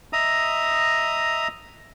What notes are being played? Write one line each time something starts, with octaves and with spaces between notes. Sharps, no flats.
D#5 E5 A#5 D#6